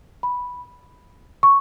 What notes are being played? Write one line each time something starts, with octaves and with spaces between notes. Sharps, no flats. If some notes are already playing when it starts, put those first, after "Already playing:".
B5
C#6